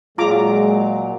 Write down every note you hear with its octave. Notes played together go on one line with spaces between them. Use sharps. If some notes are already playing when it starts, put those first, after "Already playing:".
A#2 F#3 G#3 F4 A#5 D6